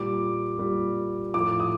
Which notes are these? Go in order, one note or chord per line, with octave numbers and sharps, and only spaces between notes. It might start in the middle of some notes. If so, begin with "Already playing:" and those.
Already playing: A#2 G3 D6
A#2 G3
A2 F3 D6
D#6